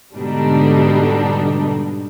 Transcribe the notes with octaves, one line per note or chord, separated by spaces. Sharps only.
G#2 B2 D3 G3 D4 D#4